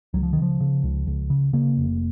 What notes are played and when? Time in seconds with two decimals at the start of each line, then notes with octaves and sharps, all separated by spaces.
0.14 C#2 F#3
0.23 F3
0.33 D#3
0.37 C#3
0.42 F3
0.60 C#3
0.83 C#2
1.07 C#2
1.30 C#3
1.53 C#3 A#3
1.77 F1